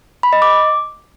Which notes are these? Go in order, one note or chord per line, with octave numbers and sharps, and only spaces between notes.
B5
D#5
D6